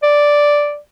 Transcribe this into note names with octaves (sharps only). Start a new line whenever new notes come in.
D5